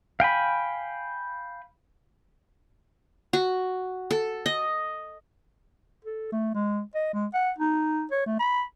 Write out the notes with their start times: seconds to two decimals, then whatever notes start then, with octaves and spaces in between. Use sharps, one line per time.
0.20 F5 G5 G#5 B5
3.33 F#4
4.11 A4
4.46 D#5
6.04 A4
6.32 A3
6.54 G#3
6.95 D#5
7.13 G#3
7.34 F#5
7.58 D#4
8.11 C#5
8.26 A3
8.39 B5